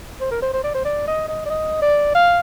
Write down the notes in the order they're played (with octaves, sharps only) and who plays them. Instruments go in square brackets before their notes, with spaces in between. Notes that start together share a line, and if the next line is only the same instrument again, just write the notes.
[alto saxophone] C5
A#4
C5
C5
D5
C5
D5
D#5
D#5
D5
D#5
D5
F5